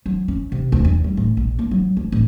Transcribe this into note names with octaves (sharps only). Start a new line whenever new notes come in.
F#3
C#4
C3
D2
E2
G3
A2
A#1
A#3
F#3
D2
A1